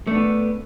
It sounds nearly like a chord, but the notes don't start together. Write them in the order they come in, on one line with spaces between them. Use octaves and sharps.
A3 D4 B3